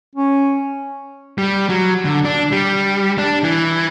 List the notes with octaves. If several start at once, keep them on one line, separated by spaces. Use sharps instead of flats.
C#4
G3
F#3
D3
D4
G3
D4
E3